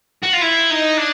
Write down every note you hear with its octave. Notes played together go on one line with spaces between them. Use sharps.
F#4
F4
E4
D#4
D4